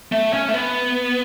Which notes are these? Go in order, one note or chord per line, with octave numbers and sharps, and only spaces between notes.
A3
C#4
A3
B3